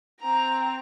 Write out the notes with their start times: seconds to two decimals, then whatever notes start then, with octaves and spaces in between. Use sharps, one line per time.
0.21 C4 A#5